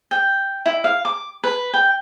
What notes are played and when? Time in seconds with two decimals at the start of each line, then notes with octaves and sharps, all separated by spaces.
0.11 G5
0.66 E4
0.84 F5
1.05 D6
1.44 B4
1.73 G5